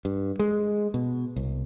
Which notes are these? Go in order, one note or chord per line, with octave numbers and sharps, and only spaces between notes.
G2
G#3
B2
C2